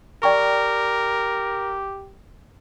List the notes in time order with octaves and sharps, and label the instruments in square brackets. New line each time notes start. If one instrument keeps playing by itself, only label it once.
[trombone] G4 [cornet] A#4 [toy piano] D5 G5 C#6